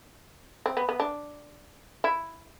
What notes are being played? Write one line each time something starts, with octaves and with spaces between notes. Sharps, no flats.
C4
B3
B3
D4
E4